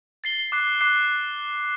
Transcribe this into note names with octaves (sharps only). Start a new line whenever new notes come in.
A6 C7 G7
D6 F#6 C7
D6 F#6 C7